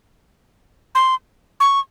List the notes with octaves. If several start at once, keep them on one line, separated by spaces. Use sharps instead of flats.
C6
C#6